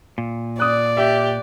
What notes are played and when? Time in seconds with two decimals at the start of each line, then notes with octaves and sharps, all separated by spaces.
0.18 A#2
0.60 D5 D#6 F#6
0.97 G4 E5